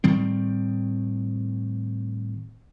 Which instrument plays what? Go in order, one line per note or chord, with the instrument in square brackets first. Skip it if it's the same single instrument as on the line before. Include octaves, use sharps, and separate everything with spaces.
[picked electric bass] A2 D#3 G3 C4